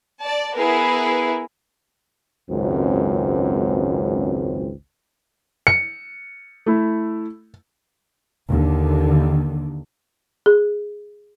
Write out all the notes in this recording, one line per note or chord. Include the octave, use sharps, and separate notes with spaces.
D5 A5
B3 E4 G#4 A#4 B4
G#1 C#2 F#2 C4
C#7
A3 E4
D#2 D3
G#4